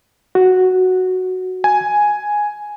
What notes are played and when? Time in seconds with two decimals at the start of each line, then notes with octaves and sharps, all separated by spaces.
0.35 F#4
1.64 G#5